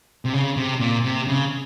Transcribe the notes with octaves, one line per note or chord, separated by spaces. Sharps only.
C3
C#3
C3
A#2
C3
C#3